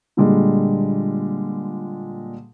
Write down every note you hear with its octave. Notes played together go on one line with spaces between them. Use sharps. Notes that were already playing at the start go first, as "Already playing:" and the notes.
A#2 D3 G3 G#3